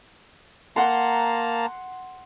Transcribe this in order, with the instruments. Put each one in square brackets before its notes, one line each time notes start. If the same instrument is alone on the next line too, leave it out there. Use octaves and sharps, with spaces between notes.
[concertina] A#3 A5 A#5 [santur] F#5 C6